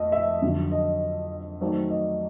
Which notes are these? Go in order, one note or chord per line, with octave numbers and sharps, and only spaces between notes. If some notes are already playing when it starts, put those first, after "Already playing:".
Already playing: F2 A3 D#5
E5
F2 D3 F#3
D#5
D#3 F#3 A3 C4 D#4 D5
D#5